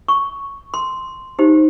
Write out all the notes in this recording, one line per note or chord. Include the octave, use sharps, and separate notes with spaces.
C#6
C6
D#4 G4 C5